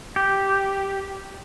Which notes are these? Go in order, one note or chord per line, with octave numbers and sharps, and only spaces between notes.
G4